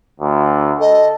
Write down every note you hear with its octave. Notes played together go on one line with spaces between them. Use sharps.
D2
A4 D#5